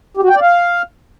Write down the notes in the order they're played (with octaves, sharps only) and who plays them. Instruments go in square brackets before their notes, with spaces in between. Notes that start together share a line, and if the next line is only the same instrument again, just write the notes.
[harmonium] G4
F#4
G5
D5
F5